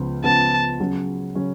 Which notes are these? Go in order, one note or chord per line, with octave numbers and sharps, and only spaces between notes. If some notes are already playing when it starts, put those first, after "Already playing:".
Already playing: C#2 C#3 F3 B3
C#2 C#3 F3 B3 A5
C#3 F#3 C#4
C#3 F#3 C#4